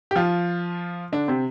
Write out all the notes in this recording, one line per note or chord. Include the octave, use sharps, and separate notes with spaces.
G4
F3 F4
D3 D4
C3 C4